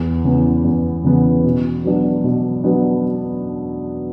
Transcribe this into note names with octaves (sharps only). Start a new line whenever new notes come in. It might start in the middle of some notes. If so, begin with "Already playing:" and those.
Already playing: E2
C#3 E3 B3 E4
E2
C#3 E3 B3 E4
B2
F#3 B3 D4
B2
F#3 B3 D4